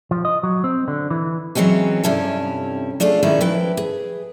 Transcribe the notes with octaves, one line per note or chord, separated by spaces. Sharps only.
F3
D#5
F#3
C4
D3
E3
E3 F#3 G#3 C4 C#4
G2 C3 C#4 E4 A4
A3 D4 F4 G#4 A4
A#2 D#3 G#3 C#4 E4
F3 E4 B4 G5
G#4